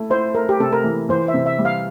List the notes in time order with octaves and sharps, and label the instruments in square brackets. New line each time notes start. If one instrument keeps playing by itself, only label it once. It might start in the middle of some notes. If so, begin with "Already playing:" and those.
Already playing: [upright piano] A3 E4
[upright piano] E4 [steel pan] C5
[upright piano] A3 [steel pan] A#4
[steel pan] G4
[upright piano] C3 [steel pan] A4
[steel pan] A#4
[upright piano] E3
[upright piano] E3 [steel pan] C5
[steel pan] E5
[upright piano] C3
[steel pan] E5
[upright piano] G3
[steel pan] F5